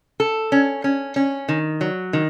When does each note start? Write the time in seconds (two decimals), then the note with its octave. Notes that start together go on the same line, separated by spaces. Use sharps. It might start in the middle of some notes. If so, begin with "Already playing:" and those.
0.20 A4
0.52 C#4
0.84 C#4
1.16 C#4
1.49 D#3
1.81 F#3
2.13 D#3